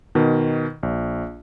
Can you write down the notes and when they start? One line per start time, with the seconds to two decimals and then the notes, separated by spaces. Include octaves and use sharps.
0.15 B2 D#3
0.83 A#1